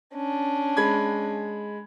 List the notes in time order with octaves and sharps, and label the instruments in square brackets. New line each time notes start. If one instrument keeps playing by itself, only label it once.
[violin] C#4 D4
[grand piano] G#3 B5 G#6